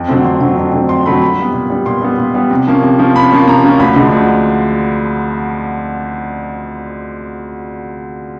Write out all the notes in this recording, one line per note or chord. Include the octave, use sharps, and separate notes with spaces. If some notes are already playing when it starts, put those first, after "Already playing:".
Already playing: F2
D3 F#3 A3 C4
F2 C6
D3 F#3 A3 C4
F2
D3 F#3 A3 C4
F2 C6
D3 F#3 A3 C4 B5
A#2 B5
G3 B3
A#2
G3 B3
A#2 C6
G3 B3
A#2
G3 B3
C3
F3 A#3 C#4
C3
F3 A#3 C#4
C3 B5
F3 A#3 C#4
C3 A#5
F3 A#3 C#4
D2 B5
D3 F3 G#3
D2